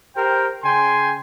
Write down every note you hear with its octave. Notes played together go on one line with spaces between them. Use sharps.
G4 A#4 C5 G5
C#3 G5 G#5 C6